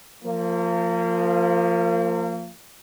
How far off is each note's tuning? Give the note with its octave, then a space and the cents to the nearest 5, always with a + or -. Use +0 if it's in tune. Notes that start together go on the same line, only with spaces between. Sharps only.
F3 +0 A#3 -35